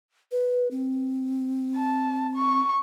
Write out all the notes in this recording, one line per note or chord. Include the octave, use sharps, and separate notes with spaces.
B4
C4
A5
C#6